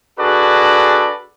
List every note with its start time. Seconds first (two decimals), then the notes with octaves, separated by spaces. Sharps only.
0.18 D4 F#4 G#4 A4 B4 D5